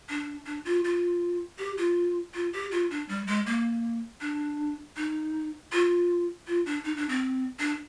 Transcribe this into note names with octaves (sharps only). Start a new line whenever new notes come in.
D4
D4
F4
F4
G4
F4
F4
G4
F4
D4
G3
G#3
A#3
D4
D#4
F4
F4
D4
D#4
D4
C4
D4